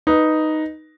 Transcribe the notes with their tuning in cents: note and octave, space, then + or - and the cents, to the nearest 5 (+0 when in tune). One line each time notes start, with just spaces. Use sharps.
D#4 +0 B4 +0